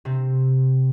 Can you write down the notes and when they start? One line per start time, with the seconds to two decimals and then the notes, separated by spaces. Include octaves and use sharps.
0.05 C3 C4